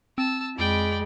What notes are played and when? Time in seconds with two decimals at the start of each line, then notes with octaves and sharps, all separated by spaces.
0.18 C4 A5 E6
0.58 F2 G#3 D5 G5 B5